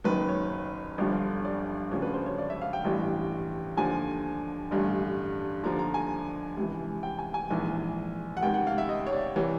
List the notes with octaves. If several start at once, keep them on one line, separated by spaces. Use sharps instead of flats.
F#1 F#2 D#3 B4
C#5
G1 G2 D3 F3
D5
D2 C#3 F3 C#5
B4
C5
C#5
D5
E5
F5
G5
A1 G2 E3
D#2 D3 F3 G#5
A1 G2 D3
D#2 D3 F3 A#5
A#5
G#5
C#2 C3 E3
G5
G#5
G#5
A#1 G#2 E3
F#5
C#2 C3 D#3 G5
F#5
F5
E5
D#5
C#5
D5
C3 E3 C#5